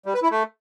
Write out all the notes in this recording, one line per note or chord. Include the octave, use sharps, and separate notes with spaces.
G3
B4
E4
A3